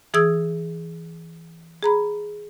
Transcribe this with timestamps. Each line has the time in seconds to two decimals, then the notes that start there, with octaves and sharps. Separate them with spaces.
0.14 E3 G#4 D#6 E6 G#6
1.83 G#4 A#5 B5